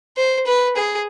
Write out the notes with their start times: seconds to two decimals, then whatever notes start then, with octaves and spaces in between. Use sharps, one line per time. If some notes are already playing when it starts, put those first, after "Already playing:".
0.17 C5
0.47 B4
0.77 G#4